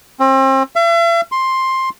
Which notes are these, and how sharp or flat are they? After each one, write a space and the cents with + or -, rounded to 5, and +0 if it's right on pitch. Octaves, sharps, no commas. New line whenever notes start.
C4 +35
E5 +45
C6 +10